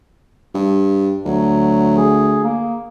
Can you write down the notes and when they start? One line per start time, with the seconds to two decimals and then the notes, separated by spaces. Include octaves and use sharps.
0.54 G2
1.25 D2 F#3
1.97 G#4
2.43 A#3